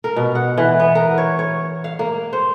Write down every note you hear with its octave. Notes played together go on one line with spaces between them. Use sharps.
A#4
B2
F#5
E3
B3
A#4
C#5
C#5
F5
A#3
C5